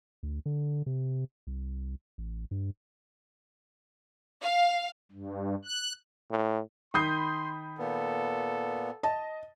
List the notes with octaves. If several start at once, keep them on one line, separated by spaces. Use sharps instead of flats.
D2
D3
C3
C2
A1
G2
F5
G2
F#6
A2
D#3 B5 C6 D#6 G6 C7
A#2 B3 A4
D#5 A5